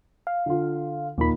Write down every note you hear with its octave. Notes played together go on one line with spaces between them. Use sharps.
F5
D3 F4
D#2 A#2 D#3 A#3 B5